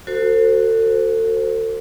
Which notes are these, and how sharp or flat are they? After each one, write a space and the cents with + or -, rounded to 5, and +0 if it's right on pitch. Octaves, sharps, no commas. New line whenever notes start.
F#4 +0 A4 +35 C5 +0